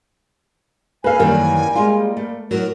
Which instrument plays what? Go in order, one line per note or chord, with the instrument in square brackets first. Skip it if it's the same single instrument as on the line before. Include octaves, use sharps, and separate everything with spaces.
[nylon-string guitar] A#3 A4 [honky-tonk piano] B4 F5 [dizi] G#5
[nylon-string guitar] F#2 D#3 E3 [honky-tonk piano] G3 A#3
[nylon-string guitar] G#3 F4
A3
[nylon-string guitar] A2 F#3 [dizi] A#4